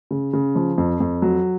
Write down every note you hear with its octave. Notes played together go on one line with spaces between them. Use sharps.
C#3
C#3
F3
F2
F2
F#3